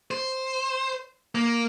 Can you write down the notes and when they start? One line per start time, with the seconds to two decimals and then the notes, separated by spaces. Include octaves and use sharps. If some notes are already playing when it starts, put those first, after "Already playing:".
0.11 C5
1.35 A#3